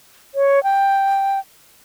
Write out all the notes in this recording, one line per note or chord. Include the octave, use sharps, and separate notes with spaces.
C#5
G5